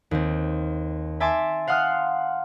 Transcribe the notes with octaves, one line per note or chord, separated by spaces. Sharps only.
D#2 C4
E5 G#5 A5 C6 D6
F5 F#5 C6 D#6 F6 F#6